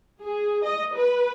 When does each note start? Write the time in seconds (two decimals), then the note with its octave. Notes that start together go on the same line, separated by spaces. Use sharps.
0.20 G#4
0.64 D#5
0.95 B4